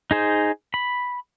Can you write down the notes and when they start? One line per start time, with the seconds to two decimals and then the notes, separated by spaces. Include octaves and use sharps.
0.11 D#4 G#4 C5
0.74 B5